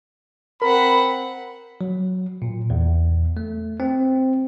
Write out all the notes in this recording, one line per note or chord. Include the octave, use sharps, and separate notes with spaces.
C4 A#4 F#5 B5
F#3
A#2
E2
A3
C4